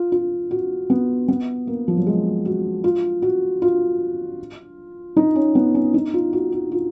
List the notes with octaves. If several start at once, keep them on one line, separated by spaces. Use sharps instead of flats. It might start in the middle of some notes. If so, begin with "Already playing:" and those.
Already playing: F4
F4
F#4
B3
B3
A#3
F3
F#3
G#3
F#4
F4
F#4
F4
D#4
C#4
B3
C#4
D#4
F4
F#4
F#4
F4